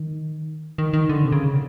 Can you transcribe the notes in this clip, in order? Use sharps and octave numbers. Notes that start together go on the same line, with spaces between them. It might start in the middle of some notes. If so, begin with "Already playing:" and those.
Already playing: D#3
D#3
D#3
D3
C3
C#3